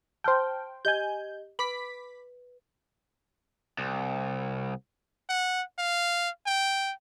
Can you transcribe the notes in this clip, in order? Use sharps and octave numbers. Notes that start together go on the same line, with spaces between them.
C5 G5 A5 F6 G6
G4 D#5 G#5 G6
B4 B5 D6 B6
C2
F#5
F5
G5